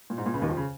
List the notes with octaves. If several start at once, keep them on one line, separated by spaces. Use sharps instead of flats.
A#2
G#2
A#2
C#2 C#3
D#2 D#3
F2 F3
C#3